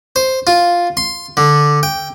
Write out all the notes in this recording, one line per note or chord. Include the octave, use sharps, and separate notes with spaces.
C5
F4
C6
D3
G5